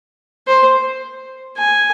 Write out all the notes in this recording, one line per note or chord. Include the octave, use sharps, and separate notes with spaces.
C5
G#5